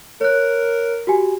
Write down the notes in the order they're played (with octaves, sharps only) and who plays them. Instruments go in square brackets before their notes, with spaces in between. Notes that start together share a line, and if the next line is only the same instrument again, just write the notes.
[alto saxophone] A#4 [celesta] C#5 F#6
[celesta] F#4 G4 G#5